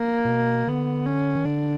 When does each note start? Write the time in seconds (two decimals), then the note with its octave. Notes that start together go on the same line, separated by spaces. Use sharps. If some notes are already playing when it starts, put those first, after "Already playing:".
Already playing: A#3
0.25 A#2
0.28 B2
0.67 D3 B3
1.06 C#4
1.35 D#3
1.45 D3 D4